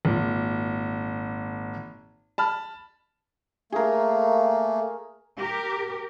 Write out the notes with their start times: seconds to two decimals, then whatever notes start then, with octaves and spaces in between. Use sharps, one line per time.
0.05 G#1 A#2
2.38 A5 B5 F6
3.72 A3 A#3 G#4 A#4
5.38 G4 A#4